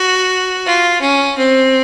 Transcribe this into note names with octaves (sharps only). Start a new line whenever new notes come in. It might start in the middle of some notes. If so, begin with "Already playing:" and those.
Already playing: F#4
F4
C#4
C4